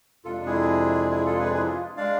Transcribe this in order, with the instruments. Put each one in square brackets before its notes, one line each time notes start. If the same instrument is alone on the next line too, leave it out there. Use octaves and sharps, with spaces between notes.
[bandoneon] F2 C3 G#3 D4 F4 A4
E4 G#4
E4 G#4
F4 A4
G#4 B4
E4 G#4
F4
G#3 D4 D5 F5